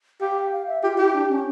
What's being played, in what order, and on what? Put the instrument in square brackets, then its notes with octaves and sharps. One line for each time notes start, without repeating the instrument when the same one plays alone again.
[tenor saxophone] G4 [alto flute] F5
[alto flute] G5
F5
E5
[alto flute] F4 [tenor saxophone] G4
[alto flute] E4 [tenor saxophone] G4
[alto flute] D4
C#4